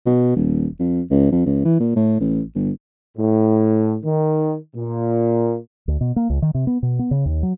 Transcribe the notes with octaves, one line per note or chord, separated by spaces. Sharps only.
B2
D#1
F2
C#2
F2
C#2
E3
A#2
A2
A1
G1
A2
D#3
A#2
D2
B2
A#3
C#2
D#3
C3
B3
B2
B3
C#3
D#2
F#3